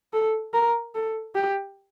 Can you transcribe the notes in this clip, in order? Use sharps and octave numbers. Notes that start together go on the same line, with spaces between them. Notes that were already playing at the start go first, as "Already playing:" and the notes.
A4
A#4
A4
G4